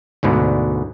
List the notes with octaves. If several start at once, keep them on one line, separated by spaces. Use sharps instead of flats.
D2 G#2 B2 D3